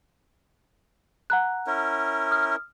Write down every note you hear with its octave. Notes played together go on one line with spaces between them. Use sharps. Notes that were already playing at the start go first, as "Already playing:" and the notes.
F#5 A#5 F#6
C#4 E4 A#4
D#6 F6